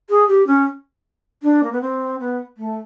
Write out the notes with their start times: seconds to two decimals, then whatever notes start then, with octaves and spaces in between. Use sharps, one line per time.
0.10 G#4
0.28 G4
0.47 C#4
1.43 D4
1.63 A#3
1.72 B3
1.81 C4
2.20 B3
2.58 A3